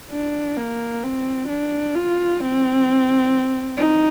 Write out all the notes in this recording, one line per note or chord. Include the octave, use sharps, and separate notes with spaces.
D4
A#3
C4
D4
F4
C4
D#4